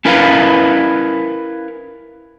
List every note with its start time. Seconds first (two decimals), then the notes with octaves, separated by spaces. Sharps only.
0.05 C#4 E4 A#4 B4 F5 A#5